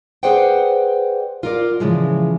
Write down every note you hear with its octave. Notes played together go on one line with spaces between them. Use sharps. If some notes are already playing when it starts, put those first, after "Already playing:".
G#4 B4 C5 D5 F#5 G5
F4 A#4 D5
C#3 E3 F3 G#3